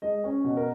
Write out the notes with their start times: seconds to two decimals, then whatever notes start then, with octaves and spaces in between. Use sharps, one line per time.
0.02 G#3 D#5
0.24 C#4
0.44 B2
0.57 A#4